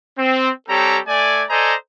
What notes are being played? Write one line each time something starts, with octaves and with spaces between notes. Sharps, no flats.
C4
G3 C4 G4 A4 C#5 A#5
A3 D5 G#5
A4 C5 D5 D#5 G#5 A#5